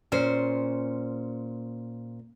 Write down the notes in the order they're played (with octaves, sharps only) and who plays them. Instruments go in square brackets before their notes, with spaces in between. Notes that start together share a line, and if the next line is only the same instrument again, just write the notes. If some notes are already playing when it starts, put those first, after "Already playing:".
[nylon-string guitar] A#2 C#4 C5